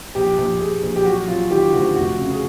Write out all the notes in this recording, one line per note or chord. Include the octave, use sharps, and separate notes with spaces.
A#1 G4
A#1
A#1 G#4
A#1
G4
F#3 F#4
F#3 F4
D#3 G4
D2 F#4
F1 F#4
C#3
G#4